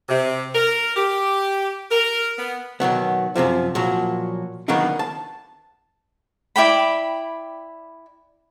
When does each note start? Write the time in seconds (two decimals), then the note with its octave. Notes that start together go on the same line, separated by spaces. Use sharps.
0.09 C3
0.54 A#4
0.96 G4
1.90 A#4
2.37 B3
2.80 B2 D#3 F#3 B3
3.35 F#2 A2 C3 F3
3.75 A#2 F3 F#3 F#4
4.68 D#3 F#3 A#3 B3 D4 D#4
4.99 A5
6.56 E4 D5 G5 B5